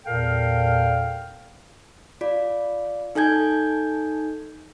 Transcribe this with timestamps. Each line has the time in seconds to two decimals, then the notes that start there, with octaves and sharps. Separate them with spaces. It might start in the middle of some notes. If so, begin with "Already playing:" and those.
0.06 E2 A#2 A4 A#4 F5 G5
2.21 F4 D5
3.15 D#4 A4 G#5 G6 G#6